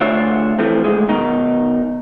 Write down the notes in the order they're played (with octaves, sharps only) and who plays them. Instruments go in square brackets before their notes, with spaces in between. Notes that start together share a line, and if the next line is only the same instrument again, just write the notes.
[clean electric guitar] D2 D4 F4 C#5 E5
E3 F3 A3 C4
D2 G#3
B2 D#3 D#4